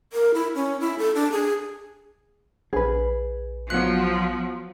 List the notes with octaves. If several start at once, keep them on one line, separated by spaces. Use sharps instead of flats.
A#4
E4
C#4
E4
A4
D4
G#4
A#1 G#4 B4
F3 F#3 B3 F#6